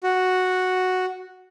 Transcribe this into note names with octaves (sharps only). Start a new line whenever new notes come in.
F#4